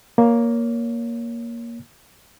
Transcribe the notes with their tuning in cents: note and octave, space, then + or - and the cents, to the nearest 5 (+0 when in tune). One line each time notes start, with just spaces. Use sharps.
A#3 +10 C#5 +20